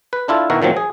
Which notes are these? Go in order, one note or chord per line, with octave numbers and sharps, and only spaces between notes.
B4
D4 E4 F4 A4
B2 D#3 E4 F#4 A#4
A#2 D#3 F3 F#3 C4
G#4